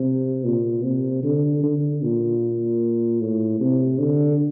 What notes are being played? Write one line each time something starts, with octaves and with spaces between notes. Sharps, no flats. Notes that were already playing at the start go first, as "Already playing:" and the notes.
Already playing: C3
A#2
C3
D3
D3
A#2
A2
C3
D3